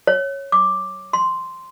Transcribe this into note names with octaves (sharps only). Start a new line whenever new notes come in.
C#5
D6
C6